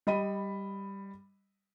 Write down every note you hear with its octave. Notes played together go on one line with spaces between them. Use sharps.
G3 D#5 B5 D#7